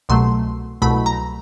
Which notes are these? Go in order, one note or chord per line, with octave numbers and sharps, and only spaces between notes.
C2 B2 F#3 A3 C6
C2 B2 F#3 A3 B5
A#5